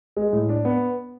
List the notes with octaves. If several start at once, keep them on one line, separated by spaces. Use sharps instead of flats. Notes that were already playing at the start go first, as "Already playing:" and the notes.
G#3
A2
D4
B3